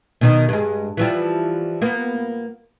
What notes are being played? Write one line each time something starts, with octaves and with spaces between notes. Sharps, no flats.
B2 D#3 D#4
G2 G#3
E3 F3 G3
A#3 B3